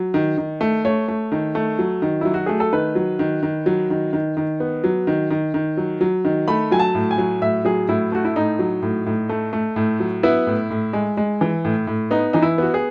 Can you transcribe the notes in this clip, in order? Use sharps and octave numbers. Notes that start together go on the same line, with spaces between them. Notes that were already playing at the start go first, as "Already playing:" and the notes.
Already playing: F#3
D#3
D#3
A3
A3 C#5
A3
D#3
A3
F#3
D#3
F#3 E4
F#4
A3 G#4
A4
D#3 B4
F#3
D#3
D#3
F#3
D#3
D#3
D#3
B3
F#3
D#3
D#3
D#3
F#3
F#3
D#3
A3 B5
F#3 G#5
A5
A2
G#5
F#3
A2 E5
F#3 G#4
A2 E4
A3 F#4
E4
A2 D#4
F#3
A2
A2
A3
A3
A2
F#3
B3 E4
A2
A2
G#3
G#3
E3
A2
A2
B3 D#4
E3 D#4
E4
B3 F#4
G#4